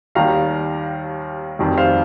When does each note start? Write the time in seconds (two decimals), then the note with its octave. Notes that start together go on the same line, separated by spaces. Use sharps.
0.15 D#2 D#3 G3 F5 A#5
1.59 F1 F2 D#3 G3
1.77 C5 F5